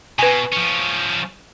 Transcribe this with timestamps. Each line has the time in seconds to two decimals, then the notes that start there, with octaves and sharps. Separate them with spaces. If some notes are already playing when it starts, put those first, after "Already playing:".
0.19 B2 B4 G#5
0.53 F3 C#4